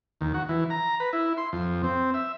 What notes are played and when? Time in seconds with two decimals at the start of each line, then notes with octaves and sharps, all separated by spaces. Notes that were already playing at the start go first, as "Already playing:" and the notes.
0.21 D#2
0.34 F#4
0.49 E3
0.70 A#5
1.00 B4
1.13 E4
1.37 C6
1.53 F2
1.84 C4
2.14 E5